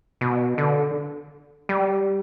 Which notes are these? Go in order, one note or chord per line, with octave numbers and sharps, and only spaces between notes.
B2
D3
G3